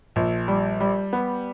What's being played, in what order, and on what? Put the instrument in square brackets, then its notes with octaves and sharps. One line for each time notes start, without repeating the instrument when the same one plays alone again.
[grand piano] A#1
G3
G3
B3